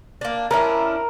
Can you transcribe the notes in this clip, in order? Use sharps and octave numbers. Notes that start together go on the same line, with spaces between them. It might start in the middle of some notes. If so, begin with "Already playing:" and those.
A#3 D4
C#4 D4 E4 A#4